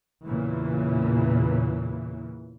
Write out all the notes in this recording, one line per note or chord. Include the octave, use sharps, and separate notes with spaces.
E2 A#2 C#3 E3